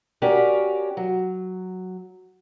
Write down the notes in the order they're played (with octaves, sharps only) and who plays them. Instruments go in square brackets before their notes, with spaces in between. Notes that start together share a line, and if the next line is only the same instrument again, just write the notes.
[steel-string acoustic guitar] C#4 F#4 G4 A#4 D5
F#3